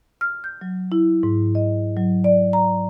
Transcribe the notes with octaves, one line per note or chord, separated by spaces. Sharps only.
F6
G6
F#3
E4
G#2
D#5
F#3
D5
A#5